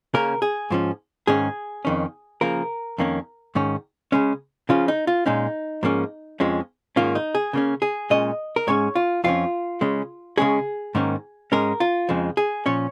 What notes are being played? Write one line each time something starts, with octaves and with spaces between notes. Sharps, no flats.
C#3 A#3 C#4 A#4
G#4
G#2 F3 C#4
G#2 D#3 C#4 G#4
F2 D#3 C#4
C#3 F3 A#3 A#4
F2 D#3 A#3 C#4
G#2 D#3 C#4
C#3 G#3 C#4
C#3 F3 C#4 F4
D#4
F4
A#2 G#3 C#4 D#4
G#2 F3 A#3 C#4
F2 F3 G#3 C#4
G#2 D#3 A#3 C#4 F4
D#4
G#4
C#3 A#3 C#4
G#4
A#2 G#3 C#4 D#5
A#4
G#2 G#3 C#4 C#5
F4
F2 F3 C#4 F4
C#3 G#3 C#4
C#3 G#3 C#4 G#4
G#2 D#3 A#3 C#4
G#2 G#3 C#4 A#4
F4
F2 C#3 F3 G#3
G#4
A#2 F3 C#4 C#5